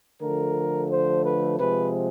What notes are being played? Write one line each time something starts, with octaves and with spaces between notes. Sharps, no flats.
D3 F3 A3 A#4
C5
B4
C3 F3 G#3 B4